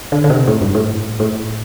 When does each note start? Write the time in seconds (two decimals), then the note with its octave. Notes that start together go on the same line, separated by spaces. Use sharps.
0.12 D3
0.24 D3
0.30 C3
0.47 A2
0.61 G2
0.75 A2
1.20 A2